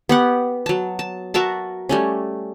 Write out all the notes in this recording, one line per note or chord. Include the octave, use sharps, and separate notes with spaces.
B3 G4 F#5
F#3 A5
A5
F#4 A#4 E5 A5
G3 A3 C#4